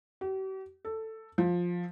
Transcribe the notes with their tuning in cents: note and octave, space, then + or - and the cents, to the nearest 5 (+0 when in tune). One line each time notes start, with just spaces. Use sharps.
G4 -45
A4 +10
F3 +10